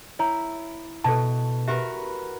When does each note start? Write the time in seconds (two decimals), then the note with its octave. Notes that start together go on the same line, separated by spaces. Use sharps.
0.19 E4 C#5 A#5
1.04 B2 A4 A5
1.68 F#4 G4 A#4 B4 E5